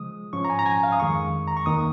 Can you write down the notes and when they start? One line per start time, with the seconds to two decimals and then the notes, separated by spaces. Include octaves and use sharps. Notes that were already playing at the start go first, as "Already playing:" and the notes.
Already playing: C#3 F3 G#3 D#6
0.33 G#2 F3 C#4 C#6
0.45 A#5
0.50 G#5
0.59 A#5
0.66 G#5
0.83 F5
0.92 D#6
1.00 F2 D#3 G#3 C#6
1.48 A#5
1.57 C#6
1.66 D#2 D#3 A#3 D#6